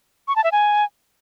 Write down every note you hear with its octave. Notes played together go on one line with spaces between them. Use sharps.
C#6
A5
E5
G#5